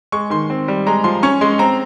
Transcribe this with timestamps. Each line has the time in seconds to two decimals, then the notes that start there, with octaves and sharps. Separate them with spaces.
0.12 G#3 C#6
0.30 D#3 C6
0.50 C4
0.68 G3
0.87 G#3 A#5
1.04 F3 C6
1.23 C#4 C#6
1.41 G#3 C6
1.59 C4 A#5